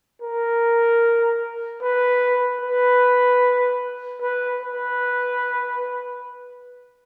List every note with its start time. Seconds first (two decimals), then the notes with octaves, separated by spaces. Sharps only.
0.22 A#4
1.82 B4
2.61 B4
4.21 B4
4.61 B4